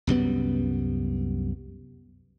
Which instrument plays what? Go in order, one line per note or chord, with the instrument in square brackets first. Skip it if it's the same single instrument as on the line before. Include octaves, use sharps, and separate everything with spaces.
[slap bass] C2 F#2 G3 B3